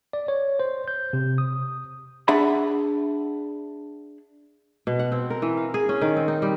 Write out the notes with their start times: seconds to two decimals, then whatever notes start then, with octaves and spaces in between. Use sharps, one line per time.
0.13 D5
0.28 C#5
0.59 C5
0.88 G6
1.13 C3
1.38 D#6
2.28 D4 G#4 E5 F#5 B5
4.87 B2
4.99 F#5
5.12 C4
5.30 A#4
5.42 E3
5.57 F5
5.74 G#4
5.89 C#4
6.01 D#3
6.17 C4
6.28 D#4
6.42 G3